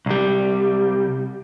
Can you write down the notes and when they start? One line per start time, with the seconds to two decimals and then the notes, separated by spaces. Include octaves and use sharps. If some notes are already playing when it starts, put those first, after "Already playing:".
0.06 C2 G3